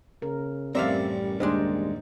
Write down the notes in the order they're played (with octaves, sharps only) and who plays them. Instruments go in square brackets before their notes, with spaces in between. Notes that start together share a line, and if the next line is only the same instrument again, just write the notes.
[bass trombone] C#3 [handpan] A#4
[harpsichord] A1 F#2 A#4 [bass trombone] G3 [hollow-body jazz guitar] C4 E5 F5 [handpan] D5
[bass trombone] D#2 [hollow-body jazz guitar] G3 G#3 D4 [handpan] D#4 C5 D#5